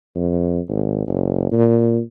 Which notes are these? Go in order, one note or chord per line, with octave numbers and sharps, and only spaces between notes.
F2
G#1
F#1
A#2